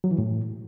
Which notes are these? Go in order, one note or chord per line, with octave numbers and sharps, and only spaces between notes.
F#3
E3
A2